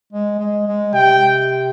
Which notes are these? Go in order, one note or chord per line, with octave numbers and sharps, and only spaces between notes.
G#3
G#3
G#3
C3 G5